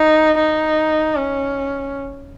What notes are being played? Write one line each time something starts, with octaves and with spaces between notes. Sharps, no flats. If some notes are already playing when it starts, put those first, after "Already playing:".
Already playing: D#4
D#4
C#4